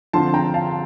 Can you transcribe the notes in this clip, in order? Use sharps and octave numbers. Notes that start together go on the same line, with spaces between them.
D3 F3 C4 F4 A5 C6
G5 A#5
F5 A5